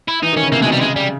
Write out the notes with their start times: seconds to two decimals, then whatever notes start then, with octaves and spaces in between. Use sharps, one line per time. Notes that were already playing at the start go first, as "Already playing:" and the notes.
0.08 E4
0.23 E3 D#4
0.33 D#3
0.37 C#4
0.43 C#3
0.52 C3 A#3
0.62 B2 G#3
0.71 C3 G3
0.81 C#3 G#3
0.96 G3